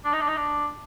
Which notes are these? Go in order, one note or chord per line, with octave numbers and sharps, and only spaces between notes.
D4
D#4
D4
D#4
D4